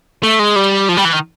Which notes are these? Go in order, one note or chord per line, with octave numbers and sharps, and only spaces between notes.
A3
G#3
G3
F3
G3
E3
D#3